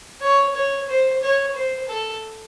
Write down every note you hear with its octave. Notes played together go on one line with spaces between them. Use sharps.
C#5
C#5
C5
C#5
C5
A4